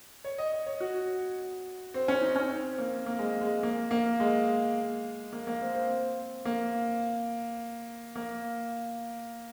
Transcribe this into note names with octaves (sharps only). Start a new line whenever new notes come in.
C#5
D#5
D#5
C#5
F#4
C4
C#4
D#4
C#4
C4
A#3
A#3
G#3
G#3
A#3
A#3
G#3
A#3
A#3
C4
C4
A#3
A#3